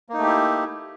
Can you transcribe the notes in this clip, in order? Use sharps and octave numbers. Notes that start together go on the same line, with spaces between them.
A3 A#3 D#4 E4 G4